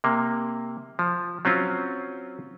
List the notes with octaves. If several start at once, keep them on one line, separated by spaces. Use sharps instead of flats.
C3 A#3
F3
F#3 C4 C#4 F4